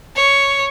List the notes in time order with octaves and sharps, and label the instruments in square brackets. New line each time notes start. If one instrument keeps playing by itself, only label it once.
[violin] C#5